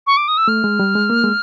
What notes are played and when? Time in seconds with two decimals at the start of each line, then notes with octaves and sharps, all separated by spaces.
0.07 C#6
0.17 D6
0.28 D#6
0.37 E6
0.48 A3 F6
0.64 G#3
0.79 G3
0.95 G#3
1.10 A#3
1.23 G#3